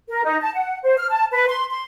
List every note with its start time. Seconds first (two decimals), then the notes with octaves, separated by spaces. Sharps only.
0.09 A#4
0.24 D#4
0.41 A5
0.55 F#5
0.83 C5
0.98 F6
1.11 A5
1.32 B4
1.48 C6
1.69 C6